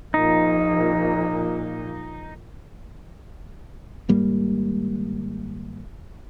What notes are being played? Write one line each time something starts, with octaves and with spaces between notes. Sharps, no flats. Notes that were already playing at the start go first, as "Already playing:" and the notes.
A#1 A#2 D#4
G#1 G#2 G3 A#3